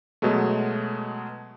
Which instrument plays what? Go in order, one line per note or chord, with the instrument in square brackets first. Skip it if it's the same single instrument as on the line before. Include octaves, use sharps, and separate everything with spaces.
[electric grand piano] B2 F#3 G#3 A3